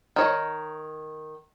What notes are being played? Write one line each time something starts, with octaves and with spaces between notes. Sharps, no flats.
D#3 C#5 D#5